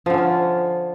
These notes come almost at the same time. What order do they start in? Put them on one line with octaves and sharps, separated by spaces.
F3 D3 C#4 F4